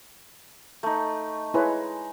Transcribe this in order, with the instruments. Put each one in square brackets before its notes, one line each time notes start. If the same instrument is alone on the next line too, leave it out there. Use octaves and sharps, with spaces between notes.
[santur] A3 D#4
[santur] G#3 [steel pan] E4 B4 C#5